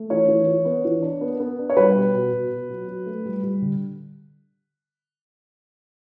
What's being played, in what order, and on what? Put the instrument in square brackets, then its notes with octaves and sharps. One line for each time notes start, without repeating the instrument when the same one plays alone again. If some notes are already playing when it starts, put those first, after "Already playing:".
Already playing: [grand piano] A3
E3 C#5
E3
E3
B3
E3
D4
B3
B3
D4
C#5
G3 B4
B2
B2
B2
B2
F#3
F#3
A3
G3
G3
D3